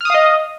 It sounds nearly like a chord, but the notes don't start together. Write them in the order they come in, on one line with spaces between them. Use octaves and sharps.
F6 D#6 F5 D#5